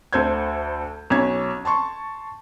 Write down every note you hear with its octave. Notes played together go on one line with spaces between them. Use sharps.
D2 A4 C5 G6 G#6
B1 C#4 G#6
A5 C6 C#6